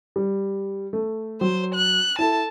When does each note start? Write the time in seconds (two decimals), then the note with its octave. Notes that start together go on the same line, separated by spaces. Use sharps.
0.16 G3
0.93 A3
1.41 F#3 C5
1.75 F#6
2.19 E4 A4 A5